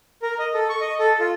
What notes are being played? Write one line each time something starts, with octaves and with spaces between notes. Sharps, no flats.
A#4
D#5
A4
C#6
D#5
A4
F4